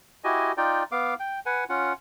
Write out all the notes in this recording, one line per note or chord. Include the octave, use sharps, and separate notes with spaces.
E4 F#4 G4 D#5 G#5
D#4 F4 D5 G5
B3 F5 D6
G5
B4 F#5 G#5
C#4 F4 F#5